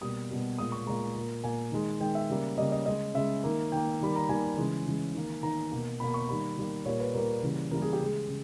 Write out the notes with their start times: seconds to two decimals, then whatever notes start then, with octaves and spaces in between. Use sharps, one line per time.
0.01 B2 G3 A#3 D#6
0.29 B2 G3 A#3
0.58 A#2 G#3 D#6
0.72 C#6
0.86 A#2 G#3 A#5
1.16 A#2 A#3
1.44 A#2 A#3 G#5
1.72 D#3 G#3
2.00 D#3 G#3 G5
2.15 E5
2.30 C#3 G3 A#3
2.57 C#3 G3 A#3 D#5
2.72 D#5
2.86 C#3 G#3 D#5
3.14 C#3 G#3 E5
3.43 D#3 A#3
3.72 D#3 A#3 G5
4.01 D#3 G3 A#3 B5
4.16 A#5
4.29 D#3 G3 A#3 G#5
4.57 C#3 E3 G#3
4.86 C#3 E3 G#3
5.14 D#3 A#3
5.43 D#3 A#3 A#5
5.72 B2 A#3
6.00 B2 A#3 B5
6.14 C#6
6.28 D#3 G3 A#3 B5
6.57 D#3 G3 A#3
6.85 A#2 G3 A#3 C#5
7.00 B4
7.14 A#2 G3 A#3 A#4
7.43 C#3 E3 G3 A#3
7.71 C#3 E3 G3 A#3 A#4
7.82 G#4
7.93 G4
8.00 C#3 G#3 G#4
8.28 C#3